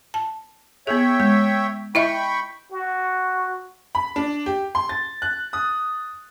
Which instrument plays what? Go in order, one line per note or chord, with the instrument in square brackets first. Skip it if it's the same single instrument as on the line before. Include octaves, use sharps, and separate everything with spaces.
[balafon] A5
[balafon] B3 G#4 [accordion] C#5 E5 G5
[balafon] G#3
[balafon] E4 D#5 E5 [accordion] G5 B5 C#6
[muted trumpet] F#4
[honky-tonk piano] B5
D4
G4
C6
A6
F#6
D#6